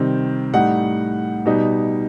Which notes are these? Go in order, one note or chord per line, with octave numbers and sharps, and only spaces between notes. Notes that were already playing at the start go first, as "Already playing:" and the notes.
Already playing: C3 D#3 G3 C4
A2 G3 D#4 F#5
B2 G3 D#4